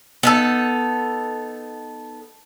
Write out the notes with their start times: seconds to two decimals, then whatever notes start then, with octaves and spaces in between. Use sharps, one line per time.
0.23 B3 D#4 A4